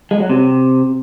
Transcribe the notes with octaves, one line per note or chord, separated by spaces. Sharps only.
G#3
F#3
C3